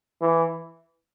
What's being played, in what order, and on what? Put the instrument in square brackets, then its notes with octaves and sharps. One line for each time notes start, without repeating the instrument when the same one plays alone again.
[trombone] E3